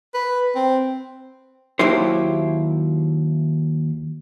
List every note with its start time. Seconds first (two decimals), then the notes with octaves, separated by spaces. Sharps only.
0.14 B4
0.55 C4
1.79 D#2 D#3 F#3 E4 G4 C5